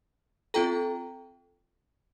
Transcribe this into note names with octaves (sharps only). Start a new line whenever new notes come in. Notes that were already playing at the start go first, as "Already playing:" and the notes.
C4 F4 A4 G5 A#5